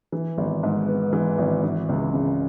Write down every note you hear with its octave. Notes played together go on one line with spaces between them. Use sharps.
E3
G#1
G#2
B3
E3
G#1
E3
C#2
C#3